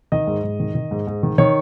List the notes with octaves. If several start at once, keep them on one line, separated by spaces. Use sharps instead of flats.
D#3 D#5
G#2
G#2
D#3
D#3
G#2
G#2
D#3
D#3 C#5